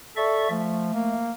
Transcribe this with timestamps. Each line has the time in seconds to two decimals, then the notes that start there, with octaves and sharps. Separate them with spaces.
0.17 A4 D5 E5 C#6
0.50 F3 A3
0.94 A#3